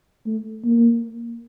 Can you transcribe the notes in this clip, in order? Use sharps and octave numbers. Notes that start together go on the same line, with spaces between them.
A3
A#3